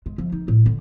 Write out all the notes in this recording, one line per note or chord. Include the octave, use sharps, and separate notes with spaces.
G#3
F3
D#4
A2
D3